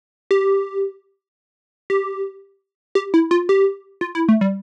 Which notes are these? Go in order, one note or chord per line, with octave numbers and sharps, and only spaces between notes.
G4
G4
G4
E4
F4
G4
F4
E4
A3
G3